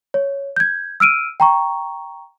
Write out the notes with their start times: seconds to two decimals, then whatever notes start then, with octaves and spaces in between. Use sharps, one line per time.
0.14 C#5
0.56 G6 G#6
1.00 E6 F6 D7 D#7
1.40 G5 A#5 C#6